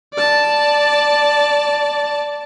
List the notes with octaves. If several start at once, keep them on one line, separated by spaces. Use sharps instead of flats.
D5 A5